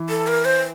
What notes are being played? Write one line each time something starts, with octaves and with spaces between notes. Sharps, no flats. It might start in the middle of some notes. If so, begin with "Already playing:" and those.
Already playing: E3
A4
A#4
C5